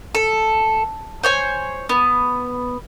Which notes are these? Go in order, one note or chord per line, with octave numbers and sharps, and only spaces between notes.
A4
C5 C#5 G#5
B3